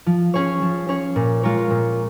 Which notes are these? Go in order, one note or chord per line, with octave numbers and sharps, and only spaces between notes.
F3
C#4 G#4 C#5
F3
C#4 G#4 C#5
A#2
G#3 F4 A#4 C#5
A#2